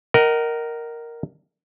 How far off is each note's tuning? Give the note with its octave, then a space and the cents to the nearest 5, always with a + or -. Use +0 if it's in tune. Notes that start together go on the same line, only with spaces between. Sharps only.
A#4 +0 D#5 +0 F#5 +40